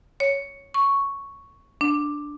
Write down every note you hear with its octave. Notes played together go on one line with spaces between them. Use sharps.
C#5
C#6
D4